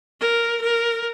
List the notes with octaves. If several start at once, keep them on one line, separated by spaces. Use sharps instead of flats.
A#4
A#4